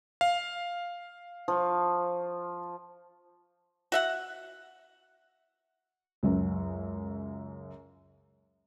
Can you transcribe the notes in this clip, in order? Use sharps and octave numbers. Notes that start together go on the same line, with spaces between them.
F5
F3 C#6
F#4 E5 F#5
C#2 F#2